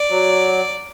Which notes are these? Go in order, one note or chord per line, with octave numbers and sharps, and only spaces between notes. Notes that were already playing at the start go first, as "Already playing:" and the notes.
Already playing: D5
F#3